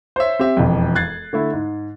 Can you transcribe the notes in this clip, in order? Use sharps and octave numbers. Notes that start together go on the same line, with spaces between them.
C5 C#5 E5
C4 G4 E5
E1 F2
F#6 G#6 A6 C7
D3 A3 E4
G#2